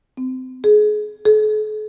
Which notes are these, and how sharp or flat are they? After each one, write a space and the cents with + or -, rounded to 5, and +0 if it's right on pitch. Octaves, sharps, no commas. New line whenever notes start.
C4 -30
G#4 +30
A4 -45